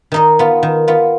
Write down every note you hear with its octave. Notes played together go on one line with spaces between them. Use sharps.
D#3 D#4 D#5
B3 F4
D#3
B3 F4